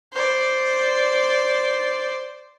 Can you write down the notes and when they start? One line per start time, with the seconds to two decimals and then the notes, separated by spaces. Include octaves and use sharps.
0.13 C5 D5